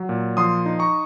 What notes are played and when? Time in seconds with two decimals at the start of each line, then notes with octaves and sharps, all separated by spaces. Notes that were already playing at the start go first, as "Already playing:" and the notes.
Already playing: F#3
0.09 A#2
0.37 F3 C6 D#6
0.66 D#4
0.79 A#5 C#6